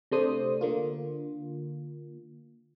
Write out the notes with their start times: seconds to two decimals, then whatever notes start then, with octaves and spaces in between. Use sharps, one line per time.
0.11 C3 A3 D4 C5 D#6
0.61 D3 A#3 F4